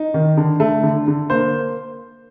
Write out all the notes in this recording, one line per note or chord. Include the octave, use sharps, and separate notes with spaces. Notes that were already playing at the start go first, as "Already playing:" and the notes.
Already playing: D#4
D#3
D3
A3
D3
D3
A#3 C5